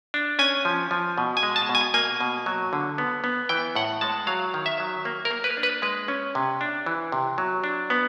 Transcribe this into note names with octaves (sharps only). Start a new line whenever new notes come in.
D4
C#4 G#5
F3
F3
B2
G#5
G#3
A5
B2
G#5
A#3 G#5
B2
F#3
D3
B3
B3
E3 G5
A2 F#5
G#3 A5
F#3 F5
D#3
E5
F#3
A#3
A#4
A#3
B4
D4
B4
G#3 B4
C#4
C3
D4
E3
C3
F#3
D4
B3